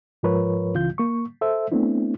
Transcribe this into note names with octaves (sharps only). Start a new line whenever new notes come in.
G#2 F3 F4 A#4 B4 C#5
C#2 C#3 E3 F4 G6
A#3 C#6
A4 C5 E5
A3 B3 C4 D4 E4